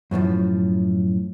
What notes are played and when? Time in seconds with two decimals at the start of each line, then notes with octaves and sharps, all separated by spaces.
0.11 F#2 A2 E3 F3